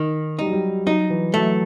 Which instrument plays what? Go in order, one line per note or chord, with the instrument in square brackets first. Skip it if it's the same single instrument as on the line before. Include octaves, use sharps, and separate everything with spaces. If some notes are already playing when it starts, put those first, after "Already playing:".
Already playing: [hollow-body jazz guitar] D#3
[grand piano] G3 [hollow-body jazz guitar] D#4
[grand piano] F#3
G3
[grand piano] F#3 [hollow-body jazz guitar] D#4
[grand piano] E3
[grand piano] F#3 [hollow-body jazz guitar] A3